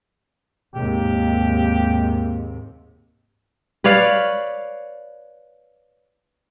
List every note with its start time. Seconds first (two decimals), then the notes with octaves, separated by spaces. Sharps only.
0.75 D#2 G#2 C3 A#3 G4
3.84 B4 C#5 D5 F5